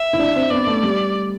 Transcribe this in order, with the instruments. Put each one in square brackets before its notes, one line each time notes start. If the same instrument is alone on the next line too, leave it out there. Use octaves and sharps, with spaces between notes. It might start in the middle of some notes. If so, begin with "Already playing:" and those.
Already playing: [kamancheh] E5
[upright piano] E4
D4
C4
[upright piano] B3 [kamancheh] D5
[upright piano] A3
G3